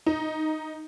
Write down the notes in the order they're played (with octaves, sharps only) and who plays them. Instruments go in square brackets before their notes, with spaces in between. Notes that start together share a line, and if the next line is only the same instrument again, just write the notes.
[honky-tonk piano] D#4